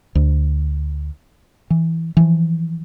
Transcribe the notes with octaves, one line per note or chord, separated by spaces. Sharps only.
D2
E3
E3 F3